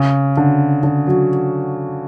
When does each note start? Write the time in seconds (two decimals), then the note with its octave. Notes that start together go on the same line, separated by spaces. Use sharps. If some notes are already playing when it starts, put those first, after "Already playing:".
Already playing: C#3
0.37 D3
0.83 D3
1.07 F#3